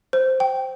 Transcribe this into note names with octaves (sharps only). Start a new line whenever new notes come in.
C5
G5